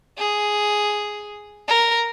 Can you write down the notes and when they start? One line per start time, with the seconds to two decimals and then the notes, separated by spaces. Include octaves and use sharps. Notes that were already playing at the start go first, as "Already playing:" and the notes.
0.18 G#4
1.68 A#4